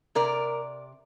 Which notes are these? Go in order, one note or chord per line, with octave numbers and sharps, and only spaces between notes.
C3 A#4 D5